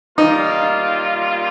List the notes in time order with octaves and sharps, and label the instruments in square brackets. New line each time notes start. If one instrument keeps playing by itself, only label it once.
[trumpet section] G3 A#3 F4 [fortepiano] D#4